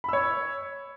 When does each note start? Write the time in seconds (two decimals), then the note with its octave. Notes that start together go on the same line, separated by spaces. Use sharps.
0.04 B5
0.09 E6
0.13 C#5